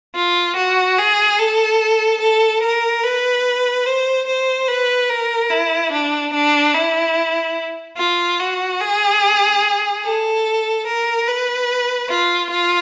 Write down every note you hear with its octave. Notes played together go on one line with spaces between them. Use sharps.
F4
F#4
G#4
A4
A4
A#4
B4
C5
C5
B4
A#4
E4
D4
D4
E4
F4
F#4
G#4
A4
A#4
B4
F4
F4